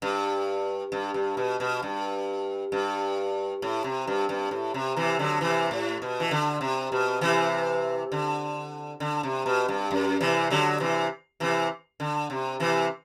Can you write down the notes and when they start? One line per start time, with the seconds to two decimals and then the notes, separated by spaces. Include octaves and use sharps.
0.02 G2
0.92 G2
1.14 G2
1.37 B2
1.60 B2
1.83 G2
2.72 G2
3.62 A2
3.84 C3
4.07 G2
4.29 G2
4.51 A2
4.74 C3
4.96 C3 E3
5.19 D3 F#3
5.41 C3 E3
5.71 A2
6.02 B2
6.20 E3
6.31 D3
6.61 C3
6.92 B2
7.21 C3 E3
8.12 D3
9.00 D3
9.23 C3
9.46 B2
9.68 G2
9.91 F#2
10.21 C3 E3
10.50 D3 F#3
10.80 C3 E3
11.40 C3 E3
12.00 D3
12.30 C3
12.60 C3 E3